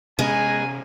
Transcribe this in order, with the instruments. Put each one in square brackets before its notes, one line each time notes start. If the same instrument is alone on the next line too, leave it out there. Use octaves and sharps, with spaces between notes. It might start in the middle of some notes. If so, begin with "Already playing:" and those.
[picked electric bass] C3 C#4 [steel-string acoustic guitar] G#3 B3 [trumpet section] A#4 G#5